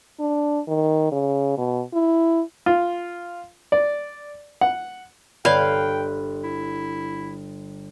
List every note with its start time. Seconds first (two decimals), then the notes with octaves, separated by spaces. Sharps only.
0.20 D4
0.68 D#3
1.12 C#3
1.57 B2
1.94 E4
2.66 F4
3.72 D5
4.61 F#5
5.45 G1 B4 C#5 D5 F5 G5
6.44 E4